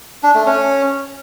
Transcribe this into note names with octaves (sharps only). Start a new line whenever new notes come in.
D4
A3
C#4